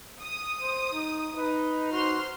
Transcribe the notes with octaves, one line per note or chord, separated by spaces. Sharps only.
D#6
C5
D#4
D#4 B4
F#4 C5 C6 F6